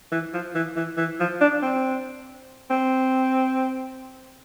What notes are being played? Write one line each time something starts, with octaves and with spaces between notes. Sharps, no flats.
E3
F3
E3
E3
E3
F3
D4
C4
C4